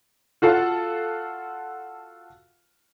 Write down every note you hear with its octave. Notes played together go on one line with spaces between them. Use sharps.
F4 F#4 A4 F5 F#5